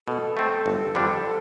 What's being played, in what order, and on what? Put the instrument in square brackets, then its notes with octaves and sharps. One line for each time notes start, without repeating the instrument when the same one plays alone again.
[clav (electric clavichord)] B2 [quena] A4
[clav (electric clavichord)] A3 C4
G1
F2 D3 G3 D4